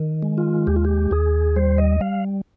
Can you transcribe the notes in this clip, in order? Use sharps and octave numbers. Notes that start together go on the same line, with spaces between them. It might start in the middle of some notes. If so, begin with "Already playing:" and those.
Already playing: D#3
G#3
F4
D#2 G4
F4
G4
D#2 G#4
G3 C5
D#5
G3 F5